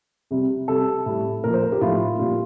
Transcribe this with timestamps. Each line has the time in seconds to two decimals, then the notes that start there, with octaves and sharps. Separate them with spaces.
0.31 C3 G3
0.68 C3 G3 A4
1.06 A2 G3
1.44 A#2 F3 A#4
1.54 C5
1.63 A#4
1.72 G4
1.81 A2 F3 F4
2.19 A#2 G3 F4